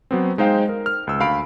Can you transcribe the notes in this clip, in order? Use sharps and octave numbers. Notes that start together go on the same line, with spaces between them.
F#3 B3 C4
G#3 D#4 C5 F5 G5
A#4
F6
C#2 E6
D2 F5 B5 D7